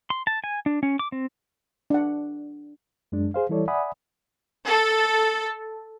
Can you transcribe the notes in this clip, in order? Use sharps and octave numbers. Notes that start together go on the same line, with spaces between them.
C6
A5
G#5
D4
C#4
D6
C4
D4 F#5
F#2 G#3 D4
G#4 C5 F5
E3 G3 E4 A4 C#5 D5
D5 E5 F#5 G#5 B5 D#6
A4